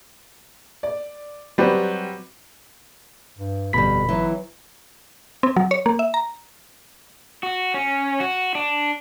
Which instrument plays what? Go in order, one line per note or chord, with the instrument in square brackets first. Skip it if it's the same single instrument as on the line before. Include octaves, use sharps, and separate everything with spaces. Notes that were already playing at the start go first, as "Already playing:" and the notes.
[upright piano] D5
[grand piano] F#3 G3 [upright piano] C4 G4 B4
[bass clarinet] G2
[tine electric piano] G1 B5 B6 [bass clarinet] F2 [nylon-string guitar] B2 G3
[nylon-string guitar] E3 D#4 [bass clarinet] F#3
[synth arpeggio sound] C4
F#3
C#5
A#3
E5
A#5
[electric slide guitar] F#4
C#4
F#4
D4